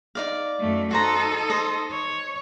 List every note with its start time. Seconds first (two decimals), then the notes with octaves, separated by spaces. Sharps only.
0.15 D#4 D5 F5
0.59 F#2 A3
0.91 D#4 F#4 A4 C5 A#5
1.50 C5 D#5
1.92 C#5